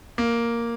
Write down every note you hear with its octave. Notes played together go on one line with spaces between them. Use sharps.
A#3